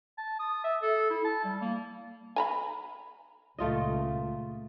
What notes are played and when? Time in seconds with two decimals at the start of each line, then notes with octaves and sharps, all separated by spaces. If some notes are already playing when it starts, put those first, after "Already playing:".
0.18 A5
0.40 D#6
0.64 E5
0.82 A4
1.10 E4
1.25 A5
1.45 G3
1.61 A#3
2.36 G#5 A#5 B5
3.58 C#2 A#2 A3 F4 D#5